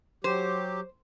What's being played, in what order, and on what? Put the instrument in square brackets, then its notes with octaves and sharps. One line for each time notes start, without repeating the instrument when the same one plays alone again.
[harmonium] F#3 G4 [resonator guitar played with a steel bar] C5